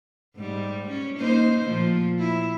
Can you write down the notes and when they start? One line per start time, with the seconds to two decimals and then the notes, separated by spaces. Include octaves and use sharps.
0.36 G#2 G3
0.88 C#4
1.19 A#3 D#4 C5
1.66 A#2 F3
2.19 E4